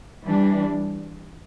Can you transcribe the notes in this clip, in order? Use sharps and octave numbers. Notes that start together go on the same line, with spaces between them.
E3 G3 D4